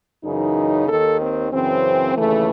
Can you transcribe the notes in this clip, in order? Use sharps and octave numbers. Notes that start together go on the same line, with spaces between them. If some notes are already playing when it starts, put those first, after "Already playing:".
F#2 C#3 E3 D#4
D#2 D#3 A4
C4
F#2 C#3 E3 C4
D#2 C#3 E3 A3